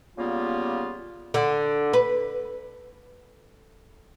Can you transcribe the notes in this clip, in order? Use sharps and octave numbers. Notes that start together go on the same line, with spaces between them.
C#3 G3 A#3 B3 F4
D3
B4